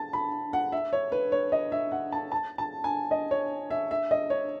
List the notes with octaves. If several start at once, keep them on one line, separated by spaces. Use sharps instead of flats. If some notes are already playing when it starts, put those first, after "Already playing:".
Already playing: A5
B5
F#5
E5
C#5
B4
C#5
D#5
E5
F#5
A5
A5
A5
G#5
D#5
C#5
E5
E5
D#5
C#5